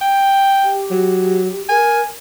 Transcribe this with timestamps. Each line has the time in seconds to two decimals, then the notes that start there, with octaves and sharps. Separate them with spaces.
0.01 G5
0.63 G4
0.91 F#3
1.69 A#4 G#5